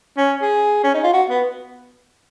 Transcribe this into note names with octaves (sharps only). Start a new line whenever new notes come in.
C#4
G#4
C#4
D#4
F4
F#4
B3